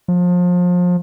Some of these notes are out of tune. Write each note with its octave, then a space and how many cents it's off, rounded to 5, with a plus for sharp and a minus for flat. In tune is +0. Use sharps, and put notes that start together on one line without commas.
F3 +30